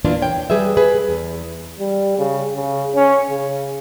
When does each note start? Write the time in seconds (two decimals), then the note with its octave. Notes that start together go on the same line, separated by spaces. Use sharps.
0.04 E2 A#2 E3 A#3 D4 F4
0.22 C#5 G5
0.50 G3 G#4 B4 E5
0.77 G#4 B4
1.09 E2
1.80 G3
2.18 C#3
2.55 C#3
2.96 C#4
3.30 C#3